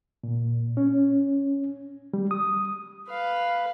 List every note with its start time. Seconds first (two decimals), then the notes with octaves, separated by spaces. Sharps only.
0.24 A#2
0.77 C#4
2.14 G3
2.31 D#6
3.08 B4 F5